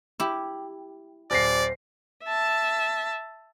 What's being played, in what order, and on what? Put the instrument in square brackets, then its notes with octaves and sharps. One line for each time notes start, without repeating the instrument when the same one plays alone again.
[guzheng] E4 G4
[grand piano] D1 A#6 C7 [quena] C5 [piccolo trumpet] D5
[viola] E5 A5